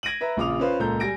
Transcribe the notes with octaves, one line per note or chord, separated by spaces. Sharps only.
G#6 A#6 D7 D#7 F#7
B4 E5 A#5
A#1 C#3 F4 D6 D#6 F7
C#4 F4 B4 C5 F5 C6
C#2 A#2 A4 A#5 G6
G3 G#5 A#6 D7